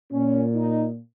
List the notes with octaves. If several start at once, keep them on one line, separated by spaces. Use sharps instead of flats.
A#2 C#4
D#4